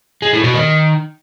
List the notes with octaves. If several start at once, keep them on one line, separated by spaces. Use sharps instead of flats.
G#3
A2
B2
D#3